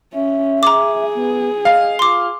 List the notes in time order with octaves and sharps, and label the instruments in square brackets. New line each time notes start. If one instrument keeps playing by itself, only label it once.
[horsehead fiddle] C#4 [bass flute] E5
[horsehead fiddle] G#4 [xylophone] A#5 D6
[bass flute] B3
[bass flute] D#5 [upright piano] F5
[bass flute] F4 [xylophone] C6 D6